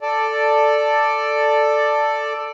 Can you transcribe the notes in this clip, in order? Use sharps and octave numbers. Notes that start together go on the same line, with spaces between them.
A4 D5